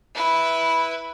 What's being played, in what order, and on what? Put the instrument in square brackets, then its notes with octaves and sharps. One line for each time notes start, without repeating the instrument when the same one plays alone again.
[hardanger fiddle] E4 B4